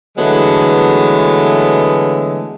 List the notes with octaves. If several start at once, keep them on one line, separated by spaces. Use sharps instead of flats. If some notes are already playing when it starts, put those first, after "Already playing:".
D3 E3 F#3 G#3 A3 B3